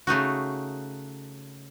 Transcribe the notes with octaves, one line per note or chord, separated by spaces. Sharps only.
C#3 A3 D#4 F#4